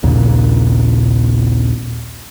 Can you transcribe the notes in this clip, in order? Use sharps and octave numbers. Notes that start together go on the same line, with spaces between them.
A#1 D#2 A#2 C#3